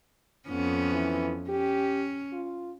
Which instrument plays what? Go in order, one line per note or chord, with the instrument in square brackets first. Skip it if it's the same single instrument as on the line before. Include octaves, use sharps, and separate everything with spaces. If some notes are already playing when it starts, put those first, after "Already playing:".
[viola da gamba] F2 B3 C#4
[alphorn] E3
[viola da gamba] C#4 [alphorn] G4
[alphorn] F4